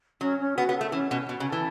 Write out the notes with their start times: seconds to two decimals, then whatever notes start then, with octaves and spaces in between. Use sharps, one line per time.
0.21 F#3 C#4
0.40 C#4
0.56 B3 F#4
0.69 B3
0.75 A4
0.81 A3
0.92 E3 C#4
1.11 B2 C#4
1.29 B2 F#4
1.40 C#3
1.46 A4
1.52 E3